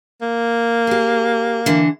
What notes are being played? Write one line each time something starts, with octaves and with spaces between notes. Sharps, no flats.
A#3
G4 G#4
D3 E3